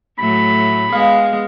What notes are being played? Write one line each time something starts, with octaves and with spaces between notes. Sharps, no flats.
A2 F#3 A3 B5
G#3 B3 G#4 F5